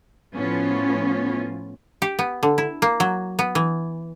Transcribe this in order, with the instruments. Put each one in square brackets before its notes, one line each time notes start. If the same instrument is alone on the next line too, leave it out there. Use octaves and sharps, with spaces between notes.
[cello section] A2 F3 B3 C#4 F4
[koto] G4
B3
D3
E4
A#3
F#3
B3
E3